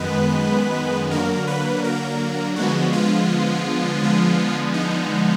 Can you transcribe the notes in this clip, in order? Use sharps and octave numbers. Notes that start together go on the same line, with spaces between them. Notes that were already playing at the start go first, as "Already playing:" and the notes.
Already playing: F#2 D#3 G#3 B3 B4
D3 F#3 A#3 A#4
B4
A#4
D3 F3 G#3 B3 F#4
F4
D3 F3 G#3 B3
D#4